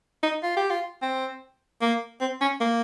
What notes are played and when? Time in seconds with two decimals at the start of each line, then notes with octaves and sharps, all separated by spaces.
0.23 D#4
0.43 F4
0.57 G4
0.70 F4
1.02 C4
1.81 A#3
2.21 C4
2.41 C#4
2.61 A#3